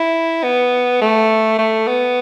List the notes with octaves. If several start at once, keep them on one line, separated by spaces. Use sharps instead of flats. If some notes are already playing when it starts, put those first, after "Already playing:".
Already playing: E4
B3
A3
A3
B3